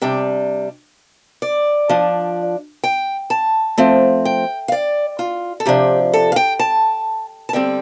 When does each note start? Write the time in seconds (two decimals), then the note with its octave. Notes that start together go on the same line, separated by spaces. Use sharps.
0.02 C3 G3 D4 G5
1.42 D5
1.89 F3 D4
2.84 G5
3.30 A5
3.78 F3 A3 C4
4.25 G5
4.68 F5
4.72 D5
5.19 F4
5.60 A4
5.66 C3 F3 D4 G4
6.14 A4
6.32 F5
6.36 G5
6.59 A5
7.49 A5
7.53 D3 G3 C4 G5